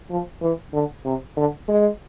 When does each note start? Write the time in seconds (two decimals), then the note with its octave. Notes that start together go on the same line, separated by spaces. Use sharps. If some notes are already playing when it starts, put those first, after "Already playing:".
0.11 F3
0.42 E3
0.74 D3
1.06 C3
1.37 D3
1.68 G#3